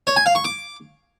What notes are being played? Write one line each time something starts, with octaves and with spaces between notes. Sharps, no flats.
C#5
G#5
F5
C#6
D6